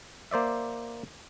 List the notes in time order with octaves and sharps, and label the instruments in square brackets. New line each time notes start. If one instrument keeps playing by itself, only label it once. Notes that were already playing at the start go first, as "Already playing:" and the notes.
[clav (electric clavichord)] A#3 C5 D5 E5